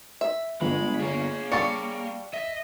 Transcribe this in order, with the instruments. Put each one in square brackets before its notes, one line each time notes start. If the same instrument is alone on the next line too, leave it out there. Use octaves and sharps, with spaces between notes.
[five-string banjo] E5
[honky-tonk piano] G1 [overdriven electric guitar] G#3 [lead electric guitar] B5
[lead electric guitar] A#3 [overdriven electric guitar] G#4 C#5
[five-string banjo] G3 D4 A5 [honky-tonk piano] F5 C#6 C#7
[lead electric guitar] D#5 [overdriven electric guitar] E5